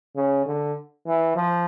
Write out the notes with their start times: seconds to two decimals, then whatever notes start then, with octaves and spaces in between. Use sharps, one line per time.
0.16 C#3
0.46 D3
1.06 E3
1.36 F3